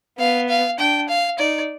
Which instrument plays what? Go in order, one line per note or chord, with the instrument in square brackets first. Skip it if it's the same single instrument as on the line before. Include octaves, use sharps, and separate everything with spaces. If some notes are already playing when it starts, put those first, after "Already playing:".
[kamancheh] B3 [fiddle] F5
[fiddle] F5
[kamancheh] D4 [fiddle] G5
[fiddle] F5
[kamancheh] D#4 [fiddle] D5